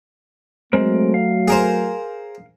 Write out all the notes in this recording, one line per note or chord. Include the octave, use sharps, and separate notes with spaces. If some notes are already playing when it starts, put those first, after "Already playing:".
F#3 G#3 A3 C4 A#4
F5
G#4 A#4 C5